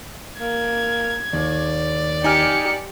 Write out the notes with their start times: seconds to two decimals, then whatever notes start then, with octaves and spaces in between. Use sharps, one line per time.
0.41 A#3 G#6
1.33 D#2 D5
2.24 D#4 G4 G#5 F6 C#7